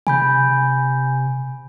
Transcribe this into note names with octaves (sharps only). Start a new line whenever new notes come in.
C3 G#5 B5 G6